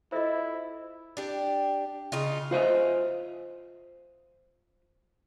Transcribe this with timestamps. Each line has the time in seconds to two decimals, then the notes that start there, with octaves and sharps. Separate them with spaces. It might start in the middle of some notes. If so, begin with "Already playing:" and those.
0.12 E4 F4 A4 C5 D#5 E5
1.17 D4 G4
2.12 C#3 D#4 F4
2.51 F4 C5 D#5 E5